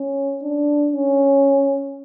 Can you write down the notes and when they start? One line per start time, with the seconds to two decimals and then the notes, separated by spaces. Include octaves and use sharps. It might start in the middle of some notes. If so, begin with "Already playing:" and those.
Already playing: C#4
0.42 D4
0.92 C#4